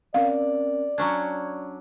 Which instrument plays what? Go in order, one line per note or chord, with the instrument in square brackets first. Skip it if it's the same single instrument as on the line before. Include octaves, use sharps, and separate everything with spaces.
[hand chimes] C4 C#4 A#4 [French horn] D5 [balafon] F5
[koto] F#3 C#4 D4 [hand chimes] G#6